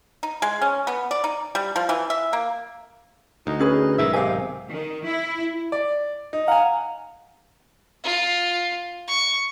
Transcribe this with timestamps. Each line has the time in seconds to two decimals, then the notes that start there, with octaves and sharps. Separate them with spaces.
0.23 D#4
0.42 G#3
0.61 C#4
0.87 B3
1.11 D5
1.24 D#4
1.55 G3
1.76 F3
1.89 E3
2.10 E5
2.33 A#3
3.47 D2 D#4
3.59 C#4 G#4 B4
3.98 B1 G#2 D#3 E5
4.13 C3 F5 G#5
4.70 D#3
5.04 E4
5.72 D5
6.33 D#4
6.48 F5 F#5 G#5 A#5
8.03 F4
9.07 C#6